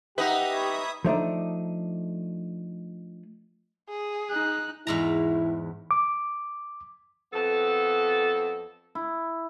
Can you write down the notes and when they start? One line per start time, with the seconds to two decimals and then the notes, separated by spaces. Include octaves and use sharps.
0.18 D#4 G4 B4 E5 F#5 D#6
0.53 C#5 B5
1.04 F3 A3 D4 D#4
3.89 G#4
4.30 D#4 F#6
4.87 E2 G#2 E4 A#5
5.91 D6
7.33 F2 B3 A4
8.95 E4